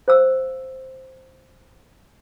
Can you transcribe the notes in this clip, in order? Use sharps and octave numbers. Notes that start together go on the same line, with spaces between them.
C5 F5 E6